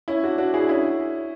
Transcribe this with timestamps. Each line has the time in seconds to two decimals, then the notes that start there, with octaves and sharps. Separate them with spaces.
0.08 C#4 E4
0.23 D4 F#4
0.38 D4 F#4
0.54 E4 G#4
0.69 C#4 E4